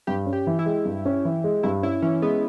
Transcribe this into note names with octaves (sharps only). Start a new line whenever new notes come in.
G2 G4
C#4
G4
E3
E4
G#3
G2
C#4
E3
G#3
G2 E4
C#4 E4
E3 C#4
G#3 B3